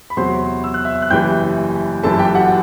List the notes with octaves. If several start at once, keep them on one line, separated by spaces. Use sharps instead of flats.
B5
E2 C3 F#3 C5 C6
E6
F#6
E5 E6
F#6
F#1 F#2 E3 G3 G5 G6
G1 F#2 E3 G3 A4 A5
G4 G5
F#4 F#5